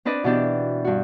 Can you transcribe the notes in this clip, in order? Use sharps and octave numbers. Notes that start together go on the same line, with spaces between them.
C4 D4 B4 D5 D#5
B2 E3 D4 G4
G2 F#4